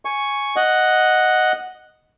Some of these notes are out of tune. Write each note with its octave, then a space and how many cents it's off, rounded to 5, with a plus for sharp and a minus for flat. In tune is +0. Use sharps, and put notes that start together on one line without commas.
G#5 +0 C#6 +0
D#5 +0 F#5 +0